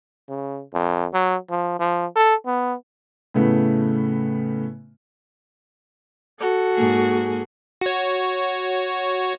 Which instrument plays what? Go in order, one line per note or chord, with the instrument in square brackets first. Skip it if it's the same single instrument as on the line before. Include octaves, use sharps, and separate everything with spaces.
[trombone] C#3
F2
F#3
F3
F3
A4
B3
[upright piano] A2 C#3 A3 B3
[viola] F#4 A4
[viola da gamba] G#2 A#3 G#4
[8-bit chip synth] F#4 C#5